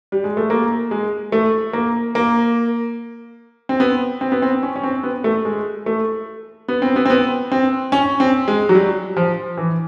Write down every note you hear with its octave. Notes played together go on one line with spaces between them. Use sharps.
G3
G#3
A3
A#3
G#3
A3
A#3
A#3
C4
B3
C4
B3
C4
C#4
C#4
C4
B3
A3
G#3
A3
B3
C4
B3
C4
B3
C4
C#4
C4
G#3
F#3
G3
F3
E3